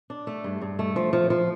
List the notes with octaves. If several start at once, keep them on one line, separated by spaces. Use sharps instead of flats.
D4
A3
G2
G2
A3
F3
F3
F3